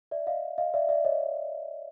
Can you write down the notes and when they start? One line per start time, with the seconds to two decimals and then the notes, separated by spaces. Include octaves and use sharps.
0.11 D5 E5
0.27 D#5 F5
0.58 D#5 F5
0.74 D5 E5
0.89 D5 E5
1.04 C#5 D#5